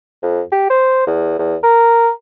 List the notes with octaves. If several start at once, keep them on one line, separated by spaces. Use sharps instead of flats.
F2
G4
C5
E2
E2
A#4